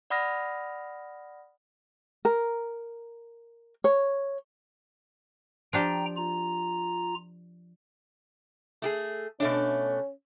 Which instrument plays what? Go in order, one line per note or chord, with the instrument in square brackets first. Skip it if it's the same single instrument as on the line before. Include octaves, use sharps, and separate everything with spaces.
[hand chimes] D5 F#5 B5 D#6 F6 A#6
[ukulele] A#4
C#5
[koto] F3 D4 G4 [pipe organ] G5 A#5
[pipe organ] F4 A#5
[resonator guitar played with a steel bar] A3 G4 G#4
[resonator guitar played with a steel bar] B2 A3 D4 [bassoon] C#4